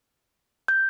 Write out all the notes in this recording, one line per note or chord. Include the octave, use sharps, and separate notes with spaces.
G6